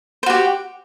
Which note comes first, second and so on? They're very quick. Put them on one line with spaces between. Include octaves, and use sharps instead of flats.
C5 F#4 G4